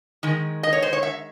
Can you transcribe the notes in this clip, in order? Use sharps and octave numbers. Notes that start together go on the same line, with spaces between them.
D#3 G#3
D#5
C#5
C5
C#5
E5